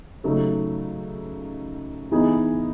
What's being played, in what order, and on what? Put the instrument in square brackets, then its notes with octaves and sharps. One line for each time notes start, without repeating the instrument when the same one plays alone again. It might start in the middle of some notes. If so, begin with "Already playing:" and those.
[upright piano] C#3 F#3 A3 D#4
E3 B3 D#4 G#4